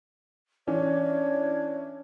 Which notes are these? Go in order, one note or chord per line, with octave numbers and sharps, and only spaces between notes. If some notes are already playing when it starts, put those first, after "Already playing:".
E3 C#4 D4 C#5